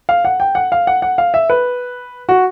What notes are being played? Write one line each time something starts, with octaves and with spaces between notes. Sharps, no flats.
F5
F#5
G5
F#5
F5
F#5
F#5
F5
E5
B4
F#4